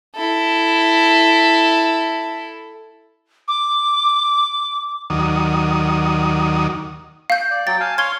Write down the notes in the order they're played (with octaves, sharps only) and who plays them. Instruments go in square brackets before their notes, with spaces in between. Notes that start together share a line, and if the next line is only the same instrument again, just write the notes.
[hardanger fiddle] E4 A4
[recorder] D6
[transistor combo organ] D#2 D#3 F#3 D5 D#6
[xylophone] F5 G6
[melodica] D5
[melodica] F#3 G5 [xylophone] A6
[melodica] F5 G#5 A5
[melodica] C#5 F5 C6 [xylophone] G#6 G7